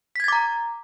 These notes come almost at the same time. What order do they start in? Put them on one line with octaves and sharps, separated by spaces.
B6 G#6 A6 D6 A#5